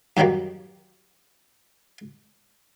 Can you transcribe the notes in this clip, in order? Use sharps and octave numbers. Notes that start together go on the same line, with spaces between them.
F#2 D#3 F#3 G3 A#3